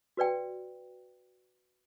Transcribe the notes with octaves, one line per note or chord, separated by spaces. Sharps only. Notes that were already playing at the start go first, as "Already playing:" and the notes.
F#4 B4 D5 G5